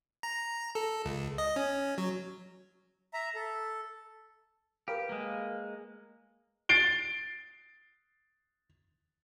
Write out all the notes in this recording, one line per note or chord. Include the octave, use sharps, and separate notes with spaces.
A#5
A4
C#2
D#5
C#4
F#3
E5 A#5
A4
G4 A#4 B4 F5
G#3 A#3
A6 C7 D7 G7